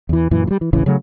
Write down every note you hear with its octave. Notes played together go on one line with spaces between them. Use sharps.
E2 E3
F#2 A#2 E3
E3 G3
E3
D1 A1 C#3 E3
C#3 F#3 A3